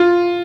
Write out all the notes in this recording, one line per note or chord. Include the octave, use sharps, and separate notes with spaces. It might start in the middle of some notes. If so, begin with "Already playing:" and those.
Already playing: F4